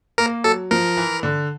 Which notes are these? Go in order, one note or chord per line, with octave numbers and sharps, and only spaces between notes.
A#3 A#4
F#3 A4
F3 A#4
E3
D3